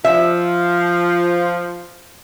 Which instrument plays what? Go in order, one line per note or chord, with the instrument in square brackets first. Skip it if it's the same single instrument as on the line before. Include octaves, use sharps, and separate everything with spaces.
[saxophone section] F3 [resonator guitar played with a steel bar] E5